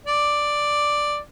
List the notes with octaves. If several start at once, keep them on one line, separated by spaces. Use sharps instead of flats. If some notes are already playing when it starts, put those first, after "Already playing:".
D5